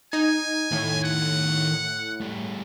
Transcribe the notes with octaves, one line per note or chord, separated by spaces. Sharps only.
D#4 G#5
A2 D#3 C#5
F#5
G3 A3